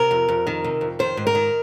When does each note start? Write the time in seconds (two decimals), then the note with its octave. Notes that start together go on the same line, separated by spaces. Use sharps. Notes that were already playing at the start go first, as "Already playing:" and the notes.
Already playing: C3 A#4
0.11 F2
0.29 F2
0.47 D#3
0.64 C3
0.81 F2
0.99 D#3 C5
1.17 G#2
1.27 A#4
1.35 D#3